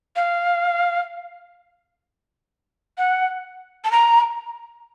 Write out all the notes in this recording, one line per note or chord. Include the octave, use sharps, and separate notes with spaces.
F5
F#5
A5
A#5